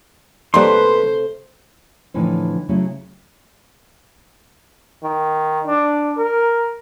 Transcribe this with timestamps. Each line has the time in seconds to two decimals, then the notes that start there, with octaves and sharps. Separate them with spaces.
0.54 C3 G3 A3 A#3 D#4 B4 C5 C6
2.14 A2 D3 E3 F3 C4 D#4
2.69 C#3 F#3 A3 E4
5.03 D#3
5.67 D4
6.17 A#4